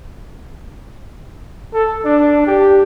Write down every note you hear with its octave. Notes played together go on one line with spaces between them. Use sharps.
A4
D4
G4